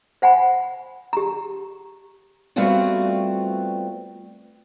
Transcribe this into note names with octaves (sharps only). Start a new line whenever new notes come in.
C5 F#5 G#5 B5
G4 A#5
G3 A3 B3 C4 F4 F#4